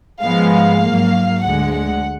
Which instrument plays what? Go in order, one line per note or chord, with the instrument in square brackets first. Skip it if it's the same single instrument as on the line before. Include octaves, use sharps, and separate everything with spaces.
[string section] G#2 F3 G#3 B3 F5
F5
G#2 F#3 A#3
D2 D3 G#3 F#5
F#5